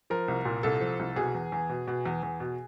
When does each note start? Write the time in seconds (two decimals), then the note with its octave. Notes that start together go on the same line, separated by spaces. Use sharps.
0.10 F3 A#4
0.28 C2
0.45 A#2
0.63 C2 A4
0.81 F3
0.99 C2
1.16 B2 G#4
1.34 E2
1.52 E2
1.69 B2
1.87 B2
2.05 E2
2.23 E2
2.40 B2